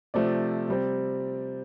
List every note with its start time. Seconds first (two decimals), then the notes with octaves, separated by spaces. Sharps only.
0.14 C3 F3 A3 C4 D5
0.68 C3 G3 C4